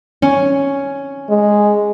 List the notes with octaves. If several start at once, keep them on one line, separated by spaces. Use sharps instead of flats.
C#4
G#3